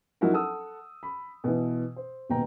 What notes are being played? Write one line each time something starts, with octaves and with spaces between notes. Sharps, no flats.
F3 F#3 D#4 E4 F#4 A#4
A4 F#5 D#6 E6
B5
B2 E3
C5
D#1 B2 G5 A#5